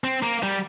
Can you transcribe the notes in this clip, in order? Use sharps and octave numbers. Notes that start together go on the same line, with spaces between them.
C4
A#3
G3